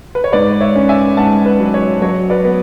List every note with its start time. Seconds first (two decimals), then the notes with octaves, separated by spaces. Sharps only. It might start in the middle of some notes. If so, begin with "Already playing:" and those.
0.15 B4
0.24 C#5
0.32 G#2 B4 D5
0.61 C#5 E5
0.76 C#4
0.89 E5 G#5
1.17 G#2 F#5 A5
1.46 B4
1.60 F#3
1.74 C#5
2.02 F#3 C#5
2.30 B4 D5
2.45 B3